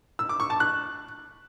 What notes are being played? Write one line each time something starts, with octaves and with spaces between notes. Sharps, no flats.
E6
D6
C#6
A5
F#6